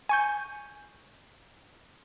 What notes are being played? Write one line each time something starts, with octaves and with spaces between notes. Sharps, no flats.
G#5 C#6 G6